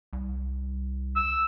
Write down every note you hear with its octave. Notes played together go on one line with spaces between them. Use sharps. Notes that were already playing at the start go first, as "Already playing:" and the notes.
C2
E6